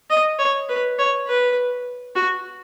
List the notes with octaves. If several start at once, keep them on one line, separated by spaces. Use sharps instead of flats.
D#5
C#5
B4
C#5
B4
F#4